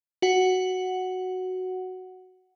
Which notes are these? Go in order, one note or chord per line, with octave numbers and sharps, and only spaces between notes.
F#4 F#5